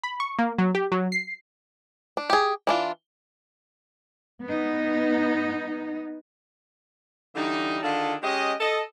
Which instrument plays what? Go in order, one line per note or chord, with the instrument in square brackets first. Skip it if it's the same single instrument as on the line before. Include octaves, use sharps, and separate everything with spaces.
[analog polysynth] B5
C#6
A#3
F#3
G4
F#3
C7
[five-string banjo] D4
G4 G#4
E3 D4 F4
[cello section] B3 D#4
[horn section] D3 E3 G3 D#4
D3 D#3 D4 F4 G#4 A4
G#3 C#4 G4 D#5
A4 D#5